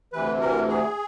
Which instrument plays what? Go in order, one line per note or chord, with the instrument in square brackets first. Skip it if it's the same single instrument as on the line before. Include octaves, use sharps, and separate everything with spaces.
[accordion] D2 C3 E3 B4
A#4
G#4